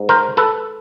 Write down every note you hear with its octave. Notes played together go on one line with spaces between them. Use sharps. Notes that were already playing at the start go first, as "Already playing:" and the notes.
Already playing: G#2
A#4 C5
A4 B4